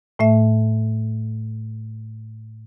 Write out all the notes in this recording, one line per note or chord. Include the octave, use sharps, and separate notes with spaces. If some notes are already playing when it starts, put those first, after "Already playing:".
A2 A3 E5